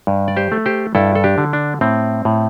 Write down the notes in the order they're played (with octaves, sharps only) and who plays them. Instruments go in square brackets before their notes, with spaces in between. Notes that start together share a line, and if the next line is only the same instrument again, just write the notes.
[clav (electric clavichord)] G2
D5
G4 C5
A3
G4 C5
G2 E4 A4
A4
D4 G4
D3
D4
A2 C4
A2